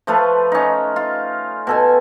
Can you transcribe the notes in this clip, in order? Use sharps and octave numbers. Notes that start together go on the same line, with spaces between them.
F3 A3 F4 B4
C#4 D#4
F4
B2 A4 G#5